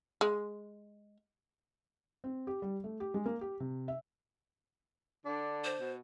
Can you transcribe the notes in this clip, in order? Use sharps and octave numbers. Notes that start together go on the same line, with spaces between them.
G#3
C4
G4
G3
A3
G4
G#3
A#3
G4
C3
E5
D3 D4
C5
B2